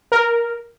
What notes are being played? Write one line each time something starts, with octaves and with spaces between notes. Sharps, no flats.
A#4